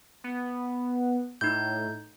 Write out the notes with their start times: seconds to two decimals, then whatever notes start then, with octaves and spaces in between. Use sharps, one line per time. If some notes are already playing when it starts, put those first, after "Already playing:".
0.24 B3
1.41 A2 D#4 G6